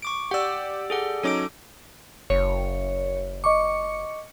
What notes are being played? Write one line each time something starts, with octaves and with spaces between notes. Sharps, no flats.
C#6 D6 D7
G4 D5 F#5 E6
G#4 A4 F#5
F#3 C#4 D#4 A4 D6 D7
F#1 C#5
D#5 C#6 D6 C#7